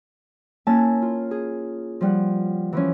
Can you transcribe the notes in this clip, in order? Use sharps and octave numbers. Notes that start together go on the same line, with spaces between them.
A#3 C#4 E4 G#5 A5
F4
G#4
F3 G3 F#5
E3 F3 C#4